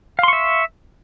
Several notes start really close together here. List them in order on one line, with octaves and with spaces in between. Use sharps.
F5 C6 C#6 E5